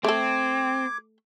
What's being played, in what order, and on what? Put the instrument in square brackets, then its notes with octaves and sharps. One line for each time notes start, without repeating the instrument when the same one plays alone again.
[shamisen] A3 A4 [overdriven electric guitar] C4 [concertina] D6 [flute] G#6